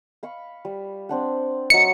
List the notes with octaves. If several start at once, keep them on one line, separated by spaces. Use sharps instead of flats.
F5 B5 C#6
G3
C4 D4 F#5
F#3 D#5 E5 C#7